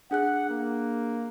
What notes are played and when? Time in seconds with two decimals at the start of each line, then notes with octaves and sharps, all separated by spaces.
0.11 D4 G#4 F#5 F#6
0.49 A#3